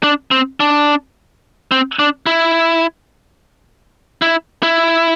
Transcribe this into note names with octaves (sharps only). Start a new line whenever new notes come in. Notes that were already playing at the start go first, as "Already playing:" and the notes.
D4
C4
D4
C4
D4
E4
E4
E4